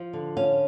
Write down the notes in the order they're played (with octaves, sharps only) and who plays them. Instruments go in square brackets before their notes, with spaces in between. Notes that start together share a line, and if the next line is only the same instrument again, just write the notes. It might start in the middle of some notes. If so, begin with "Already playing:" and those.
Already playing: [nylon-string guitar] F3
D3
C#4 F5